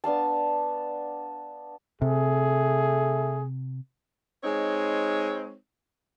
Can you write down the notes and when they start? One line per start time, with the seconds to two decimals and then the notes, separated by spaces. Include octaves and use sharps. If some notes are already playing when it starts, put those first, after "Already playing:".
0.04 B3 D4 F5 A5
2.02 C3 A3 G#4
4.43 G#3 C4 D#4 C#5